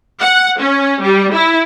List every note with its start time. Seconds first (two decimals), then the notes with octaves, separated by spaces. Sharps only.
0.20 F#5
0.59 C#4
1.01 G3
1.33 E4